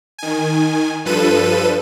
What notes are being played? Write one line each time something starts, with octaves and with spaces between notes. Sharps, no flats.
D#3 G#5
G2 F3 A4 B4 D#7